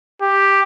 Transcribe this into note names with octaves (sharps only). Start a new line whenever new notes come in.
G4